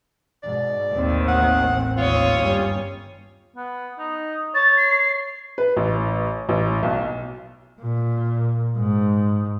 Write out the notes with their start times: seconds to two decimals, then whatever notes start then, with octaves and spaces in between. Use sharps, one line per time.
0.43 G#2 B2 D5
0.94 A1 D#2 D#3 C4
1.28 F#5
1.98 D#2 F4 C#5 D#6
2.38 G1 G3 C#4
3.56 B3
3.98 D#4
4.55 C#5 A6
4.77 C7
5.58 B4
5.77 A1
6.49 A1
6.83 B1
7.81 A#2
8.77 G#2